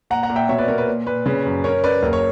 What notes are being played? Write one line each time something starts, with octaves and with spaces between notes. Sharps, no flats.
A#2 F#5 A#5
F#5 A#5
A#2
E5 G5
B2 C#5 E5
B4 D5
B2 A#4 C#5
B4
A#2
A#2 B4
C#3 B4
F#2
C#4 A#4 C#5
C#4 B4 D5
F#1 A#4
C#5